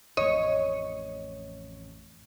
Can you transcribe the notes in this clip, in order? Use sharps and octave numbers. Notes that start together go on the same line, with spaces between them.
A1 F2 A3 C#5 D#5